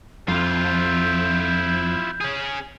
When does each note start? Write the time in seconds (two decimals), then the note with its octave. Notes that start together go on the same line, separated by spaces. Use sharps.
0.28 F2 E4 F4 G6
2.21 C#4 G#4